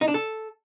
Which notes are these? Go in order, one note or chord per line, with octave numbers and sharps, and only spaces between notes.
D#4
D4
A4